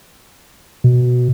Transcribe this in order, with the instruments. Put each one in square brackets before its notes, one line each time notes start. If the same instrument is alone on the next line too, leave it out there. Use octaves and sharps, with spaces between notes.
[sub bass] B2